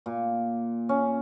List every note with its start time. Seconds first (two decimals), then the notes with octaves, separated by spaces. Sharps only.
0.06 A#2
0.89 C#4